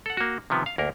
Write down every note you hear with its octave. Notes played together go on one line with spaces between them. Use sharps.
A4 F#5
A#3 F#4
C3 D#3 F3 B3
F5
D2 A#3 A#4